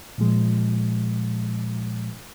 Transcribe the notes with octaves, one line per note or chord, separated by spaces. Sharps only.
A#2 F3 G#3